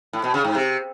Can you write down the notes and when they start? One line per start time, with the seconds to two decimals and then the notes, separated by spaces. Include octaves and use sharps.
0.13 A2
0.24 B2
0.34 C#3
0.44 G#2
0.55 C3